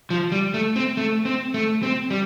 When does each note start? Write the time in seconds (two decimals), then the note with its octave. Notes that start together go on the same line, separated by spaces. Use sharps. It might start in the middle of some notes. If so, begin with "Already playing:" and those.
0.10 F3
0.32 G3
0.54 A3
0.76 C4
0.97 A3
1.25 C4
1.54 A3
1.83 C4
2.10 G3